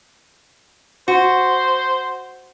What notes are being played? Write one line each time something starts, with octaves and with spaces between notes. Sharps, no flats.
F#4 C5